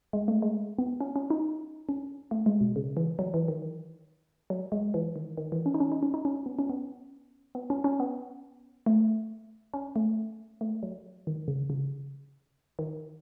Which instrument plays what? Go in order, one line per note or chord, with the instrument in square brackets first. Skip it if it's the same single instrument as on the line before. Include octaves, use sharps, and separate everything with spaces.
[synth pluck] G#3
A3
G#3
B3
C#4
C#4
D#4
C#4
A3
G#3
B2
C#3
E3
F#3
E3
D#3
F#3
G#3
E3
D#3
D#3
E3
C#4
D#4
C#4
D#4
C#4
D#4
C#4
B3
C#4
B3
B3
C#4
C#4
B3
A3
C#4
A3
A3
F#3
D#3
C#3
C#3
D#3